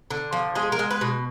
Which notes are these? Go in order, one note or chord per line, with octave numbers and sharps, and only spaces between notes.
D3
F3
G#3 G#4
A#4
G#3
B4
B2